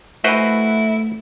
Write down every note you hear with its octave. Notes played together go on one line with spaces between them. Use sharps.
E3 A3 E4 F#4 B4 C5 D#5